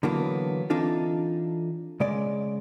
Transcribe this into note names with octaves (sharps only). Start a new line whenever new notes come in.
D3 E3 F#3 A#3 B3
E3 C4 D4 D#4 F4 A4
C#3 G#3 D5